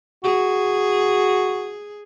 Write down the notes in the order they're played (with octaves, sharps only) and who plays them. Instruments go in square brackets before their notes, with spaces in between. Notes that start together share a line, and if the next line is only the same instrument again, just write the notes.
[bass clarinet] F#4 [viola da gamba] G#4